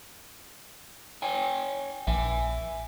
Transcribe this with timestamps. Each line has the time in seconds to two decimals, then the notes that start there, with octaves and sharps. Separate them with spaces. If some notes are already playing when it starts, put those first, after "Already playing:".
1.22 C#5 G5 G#5
2.07 A#1 E5 G#5